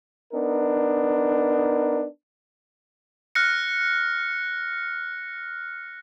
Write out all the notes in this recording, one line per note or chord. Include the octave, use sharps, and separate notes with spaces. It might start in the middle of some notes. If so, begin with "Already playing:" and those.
B3 D4 D#4 A#4
F6 F#6 A#6 C#7